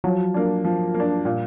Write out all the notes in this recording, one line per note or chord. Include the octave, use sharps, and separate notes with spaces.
F3 F#3
A#3 D4
F3
A#3
D4
A#2 G3